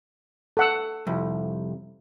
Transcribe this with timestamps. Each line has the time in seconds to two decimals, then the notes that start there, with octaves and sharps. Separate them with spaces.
0.57 A4 F#5 E6
1.07 C2 F2